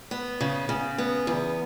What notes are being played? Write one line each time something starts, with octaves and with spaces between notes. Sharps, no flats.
B3
C#3
C#3
B3
E2